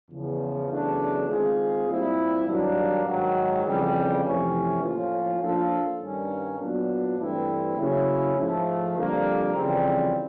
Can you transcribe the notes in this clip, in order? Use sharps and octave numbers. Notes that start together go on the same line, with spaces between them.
E2 C#3 F3
E2 C#3 F#3 A3 D4
D#3 G#3 C4 F4 G#4
A#2 G3 C4 E4
G2 D#3 F#3 A#3 D4
G#2 D#3 F#3
F2 C#3 E3 G3
F2 C3 E3 A3 C#4
A2 F3 A#3 C#4 F4
F3 A#3 D4 F4 A4
G2 D#3 G3 A#3 C#4
A#2 F#3 B3 D4
G2 E3 A3 C4 E4
C#3 F#3 A#3 C#4 E4
G#2 F3 A3
F2 D3 G3 A#3
F2 C#3 E3 G3 C4